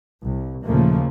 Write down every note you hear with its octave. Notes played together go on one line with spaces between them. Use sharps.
C2
D#2 A#2 C#3 F3 A3 A#3